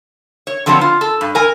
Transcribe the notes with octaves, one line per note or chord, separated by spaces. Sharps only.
C#5
D3 F3 F#3 B3 C4
F4
A4
G2
A#4 G#5